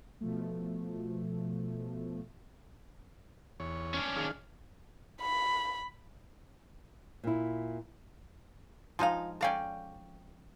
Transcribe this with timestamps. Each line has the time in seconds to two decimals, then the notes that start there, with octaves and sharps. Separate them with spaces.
0.21 B2 F3 A3
3.60 E2 C#5
3.94 C#4 D4
4.17 D#3 G#4 F5
5.21 B5
7.24 A#2 E4
8.99 F3 G#3 D#4 F4 F5
9.41 C#4 A4 D5 F5 G5 A#5